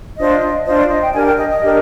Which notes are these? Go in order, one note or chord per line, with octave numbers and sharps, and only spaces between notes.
D4 F4 C5 D#5
D4 F4 C5 D#5
D5
D#5
G5
D4 G4 A#4 G#5
F5
G5
D#5
D#5
D4 G4 A#4